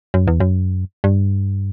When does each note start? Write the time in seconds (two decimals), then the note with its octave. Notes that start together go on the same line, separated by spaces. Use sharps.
0.14 F#2
0.28 E2
0.40 F#2
1.04 G2